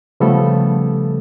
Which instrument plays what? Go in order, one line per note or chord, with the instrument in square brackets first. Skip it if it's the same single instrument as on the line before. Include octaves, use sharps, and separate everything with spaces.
[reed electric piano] C#3 F3 G3 A3 B3 A4